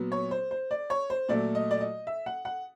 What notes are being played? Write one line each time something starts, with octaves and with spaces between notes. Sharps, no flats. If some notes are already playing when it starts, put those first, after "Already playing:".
Already playing: A#2 F#3 B3
C#5
C5
C5
D5
C#5
C5
A#2 F#3 A3 D5
D#5
D5
D#5
E5
F#5
F#5